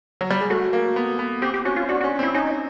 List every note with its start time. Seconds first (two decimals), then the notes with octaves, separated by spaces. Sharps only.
0.21 F#3
0.31 G3
0.41 G#3
0.50 A3 F#4
0.73 A#3
0.96 B3
1.19 B3
1.42 C4 G4
1.54 G4
1.65 C#4 F#4
1.76 F4
1.89 D4 F#4
2.01 F#4
2.04 C#4
2.19 C4
2.23 E4
2.34 C#4 D#4